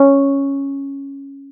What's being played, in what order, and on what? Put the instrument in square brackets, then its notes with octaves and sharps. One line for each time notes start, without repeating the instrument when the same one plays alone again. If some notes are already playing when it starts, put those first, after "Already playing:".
Already playing: [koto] C#4